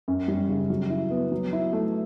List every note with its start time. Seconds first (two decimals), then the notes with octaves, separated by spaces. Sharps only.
0.08 F#2
0.28 G3
0.49 C#3
0.70 F#3
0.90 E4
1.10 B3
1.32 F#3
1.53 E4
1.73 A3